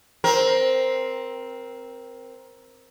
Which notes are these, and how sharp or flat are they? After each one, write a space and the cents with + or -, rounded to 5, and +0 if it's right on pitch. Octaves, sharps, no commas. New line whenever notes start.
C4 +0 A#4 +15